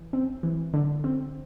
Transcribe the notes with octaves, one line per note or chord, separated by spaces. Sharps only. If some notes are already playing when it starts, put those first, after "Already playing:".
Already playing: E3
C4
E3
D3
C4